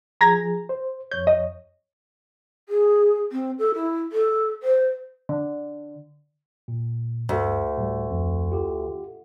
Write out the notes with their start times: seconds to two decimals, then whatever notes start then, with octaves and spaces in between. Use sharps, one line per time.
0.21 F3 G#4 A#5 G#6 A#6
0.69 C5
1.12 F2 C#5 G6
1.27 D#5
2.69 G#4
3.32 C4
3.59 A4
3.75 E4
4.12 A4
4.63 C5
5.29 D3
6.68 A#2
7.29 D2 G2
7.78 A2 G3
8.10 F2
8.52 F4 G4 A4